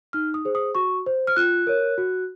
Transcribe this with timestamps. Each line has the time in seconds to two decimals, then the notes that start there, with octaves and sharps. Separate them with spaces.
0.13 D#4 F6
0.34 D#6
0.45 G#4 C5
0.55 D#6
0.75 F#4 C#6
1.06 C5
1.27 F6
1.36 F4 F#6
1.67 A#4 C#5
1.98 F#4